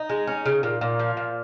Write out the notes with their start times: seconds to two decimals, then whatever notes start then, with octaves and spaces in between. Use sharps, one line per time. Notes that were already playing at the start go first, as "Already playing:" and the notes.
Already playing: D#4
0.10 G#3
0.27 C#4
0.46 C#3
0.63 A#2
0.81 A#2
0.99 F3
1.17 A#2